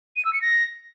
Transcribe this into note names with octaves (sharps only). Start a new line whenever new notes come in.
D#7
E6
C#7
A#6